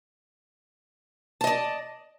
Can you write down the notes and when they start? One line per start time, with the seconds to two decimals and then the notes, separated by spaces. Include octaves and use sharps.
1.41 A5
1.44 D#5
1.47 D5